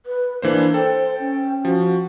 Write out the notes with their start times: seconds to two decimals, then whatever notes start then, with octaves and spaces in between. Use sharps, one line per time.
0.06 B4
0.42 E3 A#3 D4 C5
0.74 A4 C5 G5
1.19 C#4
1.65 F3 F#4